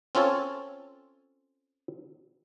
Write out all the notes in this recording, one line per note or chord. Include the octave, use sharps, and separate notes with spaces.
C4 C#4 F4 A4 C#5